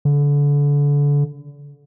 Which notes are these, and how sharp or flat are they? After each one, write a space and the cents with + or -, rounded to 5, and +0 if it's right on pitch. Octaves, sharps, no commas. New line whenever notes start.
D3 -30